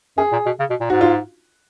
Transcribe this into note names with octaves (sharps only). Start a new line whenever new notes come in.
F#2 G#4
A#2
B2
C#3
B2
A#2
G#2 F#4
F4